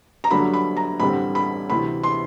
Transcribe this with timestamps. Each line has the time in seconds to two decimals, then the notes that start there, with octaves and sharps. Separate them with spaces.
0.24 A#5
0.31 G2 D3 F#3 A3 B5
0.54 B5
0.77 A#5
1.00 A1 G2 D3 G3 C4 B5
1.35 B5
1.70 D2 C3 E3 B5
2.04 C6